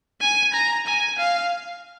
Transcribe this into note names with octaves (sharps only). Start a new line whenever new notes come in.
G#5
A#5
G#5
F5